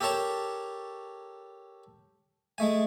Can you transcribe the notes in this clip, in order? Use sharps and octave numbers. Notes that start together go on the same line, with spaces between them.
G4 A4 A#4 C#5 A5 A#5
G#3 A3 G#5